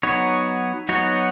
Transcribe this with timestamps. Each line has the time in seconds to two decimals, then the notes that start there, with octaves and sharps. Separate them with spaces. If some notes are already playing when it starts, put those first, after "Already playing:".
0.03 F#3 B3 D#4 F#4 C#5
0.89 F#3 B3 D#4 F#4 C#5